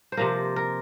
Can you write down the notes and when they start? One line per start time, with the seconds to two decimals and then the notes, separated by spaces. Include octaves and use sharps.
0.12 C5
0.17 C3 F3 A#3 A#4
0.56 A#4